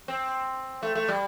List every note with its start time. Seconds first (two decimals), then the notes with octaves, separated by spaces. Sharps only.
0.08 C4
0.83 A3
0.95 A3
1.08 G3